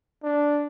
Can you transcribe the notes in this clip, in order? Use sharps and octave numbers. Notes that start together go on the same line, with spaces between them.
D4